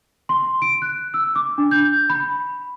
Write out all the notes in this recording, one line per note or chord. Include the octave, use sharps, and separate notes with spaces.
C6
D7
F#6
E6
D6
D4
G6
B5